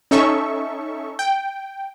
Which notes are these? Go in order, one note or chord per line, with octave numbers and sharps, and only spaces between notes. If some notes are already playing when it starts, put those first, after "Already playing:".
C#4 D#4 A4 E5 C#6
G5